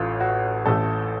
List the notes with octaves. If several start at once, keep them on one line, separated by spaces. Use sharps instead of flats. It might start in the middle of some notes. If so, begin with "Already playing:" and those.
Already playing: A1 A2 A3 F4
F#4
A1 A2 A3 A4